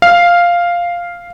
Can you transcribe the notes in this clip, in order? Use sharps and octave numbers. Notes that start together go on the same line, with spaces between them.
F5